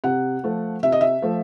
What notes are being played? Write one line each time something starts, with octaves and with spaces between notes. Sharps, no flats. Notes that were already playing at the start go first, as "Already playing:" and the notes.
C3 F#5
F3 A3
C3 E5
D#5
E5
F3 A3